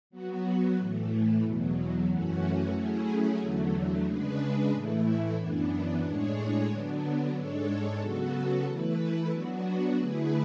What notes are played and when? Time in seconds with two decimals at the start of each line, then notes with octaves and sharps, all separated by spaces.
0.10 F#3 B3 F#4
0.76 A2 E3 A3
1.42 E2 B2 F#3
2.07 F#2 E3 A3 C#4 F#4
2.73 F#3 A3 C#4 E4 G#4
3.39 E2 D3 F#3 A3
4.04 C#3 G#3 D4 G#4 B4
4.70 A2 E3 A3 E4
5.36 F#2 E3 B3 D4
6.01 A2 G#3 D4 G#4 C#5
6.67 D3 F#3 B3 D4
7.33 G#2 G#3 D4 A4 C#5
8.00 C#3 F#3 B3 F#4 A4
8.65 E3 A3 E4 B4
9.31 F#3 B3 D4 F#4
9.96 D3 A3 E4 G#4 B4